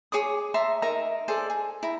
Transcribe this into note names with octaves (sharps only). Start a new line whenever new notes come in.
G#4 C#5 D6 D#6
E5 A5 A#5 C6
D#4 A#4 E5 A#5
G#4 A4 C5 D5
G#4
E4 A#5